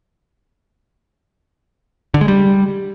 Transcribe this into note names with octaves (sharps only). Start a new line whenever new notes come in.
D3
G#3
G3